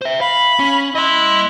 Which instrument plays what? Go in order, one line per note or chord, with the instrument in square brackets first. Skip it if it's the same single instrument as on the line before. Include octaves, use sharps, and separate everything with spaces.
[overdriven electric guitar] C5 E5
[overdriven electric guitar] F5 [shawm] B5
[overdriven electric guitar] C#4
[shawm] E4 [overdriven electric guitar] D#5 C6